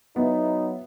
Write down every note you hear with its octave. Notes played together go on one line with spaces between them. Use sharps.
F#3 B3 D#4 E4